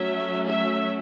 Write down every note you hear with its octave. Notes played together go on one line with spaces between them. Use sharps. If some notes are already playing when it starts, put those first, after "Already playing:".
Already playing: F#3 A3 C#4 E5
E5